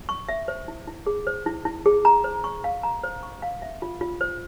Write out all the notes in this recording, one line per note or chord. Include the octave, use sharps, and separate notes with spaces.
C#6
E5
C5
E4
E4
G#4
C5
E4
E4
G#4
A#5
C5
C#6
F5
A#5
C5
C#6
F5
E5
F4
F4
C5